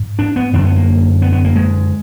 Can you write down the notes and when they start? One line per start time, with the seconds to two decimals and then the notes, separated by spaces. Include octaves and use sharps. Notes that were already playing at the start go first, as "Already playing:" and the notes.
Already playing: G#2
0.19 D4
0.36 B3
0.53 F#2 D3 D4
0.65 B3
0.76 A#3
1.22 B3
1.33 B3
1.45 A#3
1.56 G#3